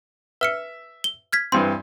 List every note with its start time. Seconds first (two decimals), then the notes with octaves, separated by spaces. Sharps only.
0.41 B4 E5 F6 C#7
1.04 G7
1.33 F6 G#6 B6
1.52 G2 E3 C4 C6